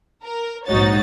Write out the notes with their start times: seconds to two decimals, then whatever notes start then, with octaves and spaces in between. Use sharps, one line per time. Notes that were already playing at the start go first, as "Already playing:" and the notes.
0.24 A#4
0.66 A#1 G#2 D#4 F#4 C#5 A6